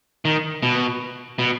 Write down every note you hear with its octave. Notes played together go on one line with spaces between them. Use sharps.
D#3
B2
B2